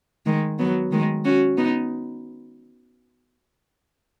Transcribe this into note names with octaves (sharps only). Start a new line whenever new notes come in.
D#3 G#3
F#3 B3
D#3 G#3
C#4 F#4
B3 D#4